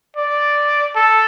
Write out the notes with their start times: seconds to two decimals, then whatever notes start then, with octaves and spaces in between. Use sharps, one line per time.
0.17 D5
0.96 A4